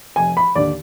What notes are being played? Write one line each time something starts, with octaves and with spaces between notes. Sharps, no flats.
F1 G#5
B5
D#2 D3 D5